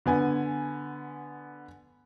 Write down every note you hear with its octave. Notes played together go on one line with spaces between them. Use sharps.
D3 B3 G#5